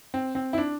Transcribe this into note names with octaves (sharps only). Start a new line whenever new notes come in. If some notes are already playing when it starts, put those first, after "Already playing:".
C4
C4
E4
D4